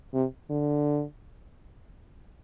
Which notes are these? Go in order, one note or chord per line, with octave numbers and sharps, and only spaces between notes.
C3
D3